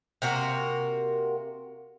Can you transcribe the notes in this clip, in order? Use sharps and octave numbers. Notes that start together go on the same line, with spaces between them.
C3 A#3 F#4 A#4